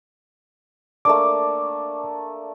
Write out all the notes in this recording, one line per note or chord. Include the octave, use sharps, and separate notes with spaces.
A3 A#3 D4 D6